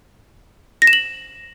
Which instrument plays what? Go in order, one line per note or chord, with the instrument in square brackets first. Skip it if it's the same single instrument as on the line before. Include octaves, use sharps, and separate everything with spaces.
[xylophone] A#6
E7
F#7